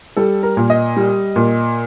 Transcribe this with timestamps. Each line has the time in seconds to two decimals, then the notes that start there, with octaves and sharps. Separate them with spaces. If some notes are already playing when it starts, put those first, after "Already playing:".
0.16 G3 A4
0.43 A#4
0.57 A#2
0.70 D#5
0.97 G3
1.36 A#2